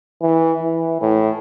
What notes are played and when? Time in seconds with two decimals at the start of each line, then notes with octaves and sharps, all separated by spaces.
0.21 E3
0.62 E3
1.01 A2